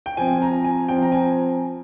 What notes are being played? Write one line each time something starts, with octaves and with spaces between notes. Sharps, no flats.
G5
F3 C4 G#5
A#5
G#5
F3 C4 G5
A#5
G#5